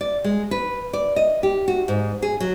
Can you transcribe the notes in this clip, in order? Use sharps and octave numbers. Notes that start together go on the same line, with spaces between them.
D5
G#3
B4
D5
D#5
G4
F#4
G#2
G#4
F#3